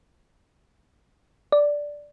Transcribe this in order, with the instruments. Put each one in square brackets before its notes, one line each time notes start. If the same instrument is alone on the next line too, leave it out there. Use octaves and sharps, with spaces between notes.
[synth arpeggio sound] D5